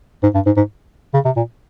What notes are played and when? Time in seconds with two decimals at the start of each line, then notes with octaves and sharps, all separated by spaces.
0.23 G#2
0.35 G2
0.46 G#2
0.57 G#2
1.14 C#3
1.25 C3
1.37 A#2